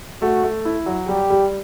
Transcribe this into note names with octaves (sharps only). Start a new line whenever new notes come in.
A3 F#4
A3
E4
F#3
G3 G4
G3